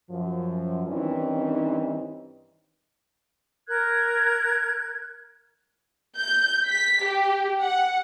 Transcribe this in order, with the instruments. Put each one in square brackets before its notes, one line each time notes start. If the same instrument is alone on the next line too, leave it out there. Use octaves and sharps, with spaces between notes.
[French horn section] F#2 F3
G2 D#3 E3 C4 C#4 D#4
[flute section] A#4 F#6 G#6
[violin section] G6
B6
G4
F#5